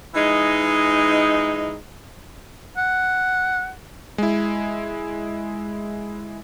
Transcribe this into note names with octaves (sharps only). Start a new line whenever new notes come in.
E3 G#3 D#4
F#5
G#3 E4